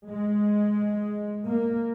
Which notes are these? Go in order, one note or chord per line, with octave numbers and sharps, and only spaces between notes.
G#3
A#3